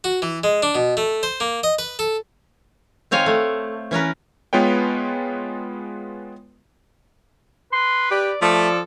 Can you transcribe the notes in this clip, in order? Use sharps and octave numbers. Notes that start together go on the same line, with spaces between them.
F#4
E3
G#3
D4
B2
A3
C5
A#3
D#5
B4
A4
D#3 C4 C#5 F5 G#5
A3
E3 C#4 A#4 B4
G#3 B3 F4 B4 C#5 G5
B4 C6
G4 D5
F3 A3 A4 D5